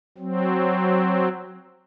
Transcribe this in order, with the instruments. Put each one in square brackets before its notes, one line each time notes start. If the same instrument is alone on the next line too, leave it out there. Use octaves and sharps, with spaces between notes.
[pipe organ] F#3 C4